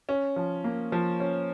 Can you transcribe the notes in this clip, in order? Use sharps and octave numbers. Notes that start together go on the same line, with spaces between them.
C#4
F3
A#3
F3
C#4